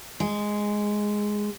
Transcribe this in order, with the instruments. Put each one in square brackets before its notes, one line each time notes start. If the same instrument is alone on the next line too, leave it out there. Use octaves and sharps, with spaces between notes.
[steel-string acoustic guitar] G#3